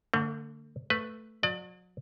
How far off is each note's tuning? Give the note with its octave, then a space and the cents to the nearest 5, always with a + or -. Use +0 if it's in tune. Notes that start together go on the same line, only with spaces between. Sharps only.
D3 +0 A3 +40 A4 +30
A3 +0 B4 +0
F#3 -35 D5 +35